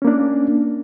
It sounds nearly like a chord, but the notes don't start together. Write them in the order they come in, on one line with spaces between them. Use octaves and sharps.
C#4 A#3 D4